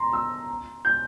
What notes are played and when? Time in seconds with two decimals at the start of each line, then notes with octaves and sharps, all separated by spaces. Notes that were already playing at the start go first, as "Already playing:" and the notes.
Already playing: A#5 C6
0.13 E6
0.85 G6